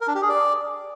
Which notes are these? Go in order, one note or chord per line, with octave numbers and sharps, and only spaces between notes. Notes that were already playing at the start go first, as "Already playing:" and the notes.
A#4
D4
G4
G#4
D5